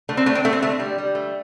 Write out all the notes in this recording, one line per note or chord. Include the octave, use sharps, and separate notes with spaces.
D3 A3
C4
D3 A3
C4
D3 A3
C4
D3 A3
G3
G3
A3